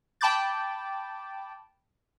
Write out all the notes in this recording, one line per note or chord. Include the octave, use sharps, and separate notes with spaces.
G5 A5 B5 D6 G6 A6